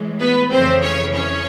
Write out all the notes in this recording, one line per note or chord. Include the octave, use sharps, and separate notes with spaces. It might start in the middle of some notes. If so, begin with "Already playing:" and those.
Already playing: A2 E3 G#3
B3 B4
F2 C#3 E3 C4 C5
C#4 C#5
C#4 C#5